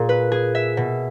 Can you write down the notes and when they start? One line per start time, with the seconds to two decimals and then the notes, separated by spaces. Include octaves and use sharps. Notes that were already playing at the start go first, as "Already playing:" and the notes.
Already playing: A#2 G#4
0.09 B4
0.32 G#4
0.55 E5
0.77 B2